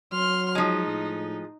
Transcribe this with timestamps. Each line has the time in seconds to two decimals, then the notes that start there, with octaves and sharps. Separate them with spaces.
0.12 F#3 C6 F6
0.55 F3 G#3 D#4
0.86 A2